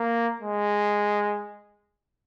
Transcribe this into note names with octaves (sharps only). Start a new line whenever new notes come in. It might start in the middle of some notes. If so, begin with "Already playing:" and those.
Already playing: A#3
G#3